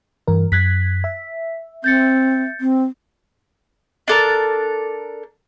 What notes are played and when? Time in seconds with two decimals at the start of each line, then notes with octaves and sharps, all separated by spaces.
0.27 G2 E3 A#4
0.52 F#2 F#6 G#6 B6
1.04 E5
1.84 C4 G6 A6 C#7
2.61 C4
4.08 D4 A4 A#4